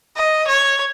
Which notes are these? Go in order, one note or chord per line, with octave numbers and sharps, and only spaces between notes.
D#5
C#5